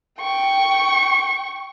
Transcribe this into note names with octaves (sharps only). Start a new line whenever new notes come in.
G5 C#6